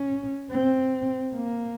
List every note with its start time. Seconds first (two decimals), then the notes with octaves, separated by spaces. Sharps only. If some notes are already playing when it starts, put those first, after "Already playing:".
Already playing: C#4
0.52 C4
1.34 A#3